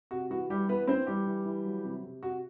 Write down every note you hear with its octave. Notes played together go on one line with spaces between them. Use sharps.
C3 F#4
E3 F#4
E3 G3 G4
E3 B3 B4
E3 C4 C5
E3 G3 G4
E3
E3
F#3
C3
C3
C3 F#4